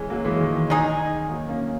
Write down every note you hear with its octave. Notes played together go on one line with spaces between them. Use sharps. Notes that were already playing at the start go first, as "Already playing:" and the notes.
Already playing: E3 G#3 C#4
F#3 A#3
E3 G#3
D#3
D#3
D#3 G#3 D#4 G#4
F#3 A#3
A#3 C#4